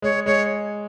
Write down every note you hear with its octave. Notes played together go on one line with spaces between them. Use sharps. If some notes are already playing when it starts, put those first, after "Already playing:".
G#3 C#5
G#3 C#5